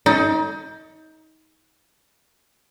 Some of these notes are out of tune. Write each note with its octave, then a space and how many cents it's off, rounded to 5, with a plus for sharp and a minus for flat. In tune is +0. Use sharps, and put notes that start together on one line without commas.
D#4 +25